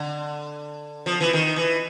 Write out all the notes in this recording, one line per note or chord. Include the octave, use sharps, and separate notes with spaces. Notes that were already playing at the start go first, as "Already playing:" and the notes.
Already playing: D3
F3
E3
D#3
E3